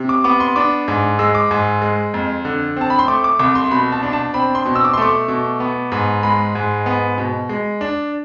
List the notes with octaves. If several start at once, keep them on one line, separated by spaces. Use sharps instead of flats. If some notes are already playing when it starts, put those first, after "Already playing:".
Already playing: C3
D6
B3 D6
C6
D4 D6
G#2
G#3 E6
D6
G#2
G#3
F2
D3
C4 A5
B5
C6
A3 D6
D6
C2 D6
C6
B2 B5
A5
D4
A5
C4 B5
C6
B2
E6
D6
C6
A3 D6
B2
B3
G#2
G#3 B5
G#2
B3
B2
G#3
D4